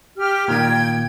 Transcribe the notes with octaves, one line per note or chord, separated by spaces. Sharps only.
G4 F6
A#2 D#3 A#3 G5 G#6